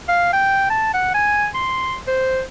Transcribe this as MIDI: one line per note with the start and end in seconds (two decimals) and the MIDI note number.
0.08 0.32 77
0.33 0.66 79
0.70 0.90 81
0.94 1.09 78
1.14 1.47 80
1.55 1.96 84
2.07 2.42 72